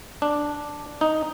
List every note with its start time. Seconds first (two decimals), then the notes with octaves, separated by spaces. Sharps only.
0.22 D4
1.01 D#4